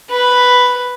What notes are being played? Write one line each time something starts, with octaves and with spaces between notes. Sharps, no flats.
B4